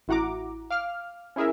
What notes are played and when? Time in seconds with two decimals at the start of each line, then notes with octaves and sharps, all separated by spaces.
0.08 A1 E4 F#4 F#5 A#5 D6
0.70 F5 D6 F6
1.36 C#4 E4 G#4 A#4 E5